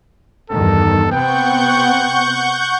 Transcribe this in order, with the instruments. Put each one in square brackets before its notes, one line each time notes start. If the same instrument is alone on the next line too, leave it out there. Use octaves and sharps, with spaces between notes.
[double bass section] E2 G2 D#3 [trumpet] A4
[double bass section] C3 B3 C4 [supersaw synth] F#5 C#6 G6 [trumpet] G5